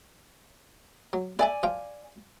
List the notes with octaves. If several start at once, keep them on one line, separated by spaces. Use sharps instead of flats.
F#3
E4 D5 E5 G#5
F3 F5 G5